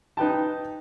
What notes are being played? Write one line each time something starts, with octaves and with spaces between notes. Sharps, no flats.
D#4 B4 G5 A5